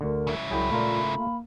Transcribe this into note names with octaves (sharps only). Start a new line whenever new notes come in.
D2 D3 A#4
C#3 E4
C2 F#3 G#4 G5 B5
A#2 A3 F4 A#4
A#3